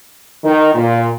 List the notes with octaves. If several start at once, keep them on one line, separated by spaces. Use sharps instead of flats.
D#3
A#2